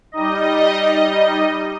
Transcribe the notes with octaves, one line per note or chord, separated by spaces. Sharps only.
G3 D#4 D#5